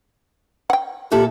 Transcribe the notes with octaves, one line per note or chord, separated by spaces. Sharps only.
F#5 G5
A#2 E4 G4 A4